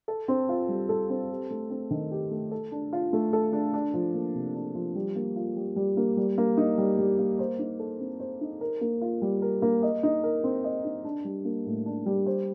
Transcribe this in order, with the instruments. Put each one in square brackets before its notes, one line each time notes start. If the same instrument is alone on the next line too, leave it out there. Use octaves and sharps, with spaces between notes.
[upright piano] A4
C4
F4
G3
A4
C4
G4
A3
C4
D#3
G4
A3
A4
D4
F4
A3
A4
D4
D4
F3
A#3
C3
D4
F3
G3
A#3
F4
G3
G3
A#3
G3
A#3
D#4
G3
G3
A#3
C5
D#4
A4
C4
C5
D#4
A#4
A#3
F4
G3
A#4
A#3
D#5
D#4
A#4
C4
D#5
D#4
D4
G3
A#3
A2
D4
G3
C5